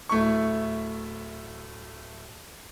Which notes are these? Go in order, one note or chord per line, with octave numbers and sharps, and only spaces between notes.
D1 A3 E4 C#6